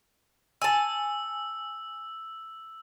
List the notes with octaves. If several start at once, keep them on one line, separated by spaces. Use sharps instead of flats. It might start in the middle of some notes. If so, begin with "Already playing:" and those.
G#5 A5 E6